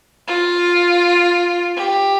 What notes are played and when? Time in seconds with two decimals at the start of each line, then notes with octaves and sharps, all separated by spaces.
0.28 F4
1.76 G4